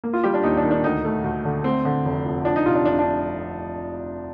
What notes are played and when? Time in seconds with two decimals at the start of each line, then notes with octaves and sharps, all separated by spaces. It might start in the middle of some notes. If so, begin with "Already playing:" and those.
0.04 A#3
0.13 F4
0.23 G3 G4
0.34 D4
0.43 D#2 D#4
0.57 D4
0.64 D#3
0.71 D4
0.84 D2 D#4
1.05 A3
1.24 D2
1.45 D3
1.64 A3 C4
1.85 D3
2.05 F1
2.26 F2
2.45 F3 D4
2.56 D#4
2.66 C3 F4
2.75 D4
2.85 F1 D4
2.99 D4